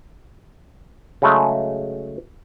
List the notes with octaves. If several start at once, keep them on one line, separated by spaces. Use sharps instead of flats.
C#3 F#3 G#3 A3